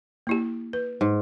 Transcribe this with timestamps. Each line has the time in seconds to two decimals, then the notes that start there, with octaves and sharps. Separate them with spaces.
0.27 A#3 E4 G4
0.73 B4
1.01 G#2